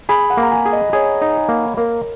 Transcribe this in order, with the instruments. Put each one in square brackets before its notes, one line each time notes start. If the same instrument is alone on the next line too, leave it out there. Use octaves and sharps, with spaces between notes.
[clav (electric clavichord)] G#4 [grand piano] B5
[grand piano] F#5
[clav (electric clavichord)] A#3
[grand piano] A#5
G#5
[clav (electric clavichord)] G#4
[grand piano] D#5
[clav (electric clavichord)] G#4 [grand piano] C#5
[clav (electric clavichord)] D#4
A#3
[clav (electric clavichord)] A#3 [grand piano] A#4